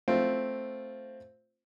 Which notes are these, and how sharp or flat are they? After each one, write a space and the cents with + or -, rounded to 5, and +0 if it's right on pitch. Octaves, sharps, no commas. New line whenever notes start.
A3 +0 C4 +0 F4 +0